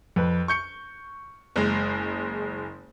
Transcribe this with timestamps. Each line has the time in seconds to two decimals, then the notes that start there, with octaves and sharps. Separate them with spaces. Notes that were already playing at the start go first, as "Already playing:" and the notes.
0.16 F2 B4
0.48 C#6 G6 C#7
1.56 F#1 G#3